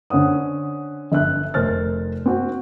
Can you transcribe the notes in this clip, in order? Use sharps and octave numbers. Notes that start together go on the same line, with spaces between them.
D3 C#4 C5 F#5 D#6
G1 E5 F#6
F1 A#4 C5 F6 A6
C4 F#4